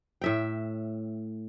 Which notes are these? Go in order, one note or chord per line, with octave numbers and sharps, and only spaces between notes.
A2 E5 G5